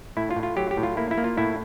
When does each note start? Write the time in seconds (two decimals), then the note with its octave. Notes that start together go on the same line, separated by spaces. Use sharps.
0.17 A2 E4
0.31 F4
0.36 A2
0.43 F4
0.57 F#3 G4
0.71 G4
0.77 A2
0.83 F4
0.97 A#3 E4
1.11 E4
1.18 A#3
1.24 F4
1.37 A2 E4